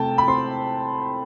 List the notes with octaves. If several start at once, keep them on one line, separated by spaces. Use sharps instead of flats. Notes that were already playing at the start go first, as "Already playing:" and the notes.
Already playing: C3 A3 G5 A5
B5
C4 C6